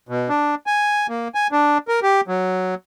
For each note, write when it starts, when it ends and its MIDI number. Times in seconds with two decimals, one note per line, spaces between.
0.09 0.29 47
0.29 0.55 62
0.67 1.07 80
1.09 1.28 58
1.35 1.47 80
1.52 1.78 62
1.88 2.00 70
2.03 2.21 67
2.28 2.75 54